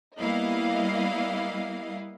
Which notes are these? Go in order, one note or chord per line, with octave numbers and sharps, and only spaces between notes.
G3 A#3 B3 E4 D#5 F5